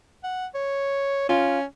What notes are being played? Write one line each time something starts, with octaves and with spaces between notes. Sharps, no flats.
F#5
C#5
C#4 F4